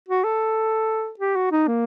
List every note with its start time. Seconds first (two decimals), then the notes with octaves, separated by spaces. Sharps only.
0.09 F#4
0.24 A4
1.20 G4
1.36 F#4
1.52 D#4
1.68 A#3